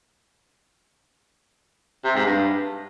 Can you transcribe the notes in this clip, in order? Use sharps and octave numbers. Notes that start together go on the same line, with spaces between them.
C3
G#2
G2